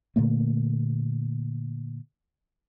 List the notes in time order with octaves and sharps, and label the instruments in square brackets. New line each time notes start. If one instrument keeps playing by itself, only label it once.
[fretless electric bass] A#2 D3 A3 A#3